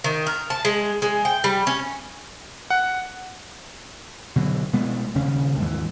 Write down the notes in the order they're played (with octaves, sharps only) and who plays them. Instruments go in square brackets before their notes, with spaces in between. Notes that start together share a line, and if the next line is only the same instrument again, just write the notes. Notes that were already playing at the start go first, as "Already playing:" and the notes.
[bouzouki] D#3
A#4
A5
G#3
G#3
G5
G3
C#4
[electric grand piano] F#5
[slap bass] B2 D3 F#3
B2 G#3 A3 B3
D#1 C#3 C#4
D#2 G#2 E3